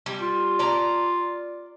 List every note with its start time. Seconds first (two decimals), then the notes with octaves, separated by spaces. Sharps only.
0.06 G3
0.21 F4
0.59 D5 A#5